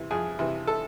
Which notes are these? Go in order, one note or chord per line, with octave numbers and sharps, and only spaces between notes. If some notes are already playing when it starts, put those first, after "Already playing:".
Already playing: C3 E3
F2 G#4
C3 E3
A4